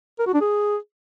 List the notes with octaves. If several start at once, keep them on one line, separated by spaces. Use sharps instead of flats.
A#4
F#4
D4
G#4